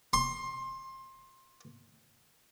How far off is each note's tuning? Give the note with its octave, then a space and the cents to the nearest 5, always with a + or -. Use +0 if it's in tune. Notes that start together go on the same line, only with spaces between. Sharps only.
C6 +20